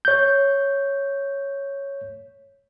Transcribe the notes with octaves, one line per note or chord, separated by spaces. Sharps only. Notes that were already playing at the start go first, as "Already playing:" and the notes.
C#5 G6